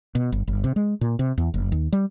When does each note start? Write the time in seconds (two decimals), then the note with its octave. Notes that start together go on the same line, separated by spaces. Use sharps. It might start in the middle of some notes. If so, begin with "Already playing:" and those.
0.15 B2
0.32 G1
0.47 G1
0.64 C3
0.76 G#3
1.01 A#2
1.19 C3
1.38 E2
1.54 F#1
1.72 D#2
1.92 G3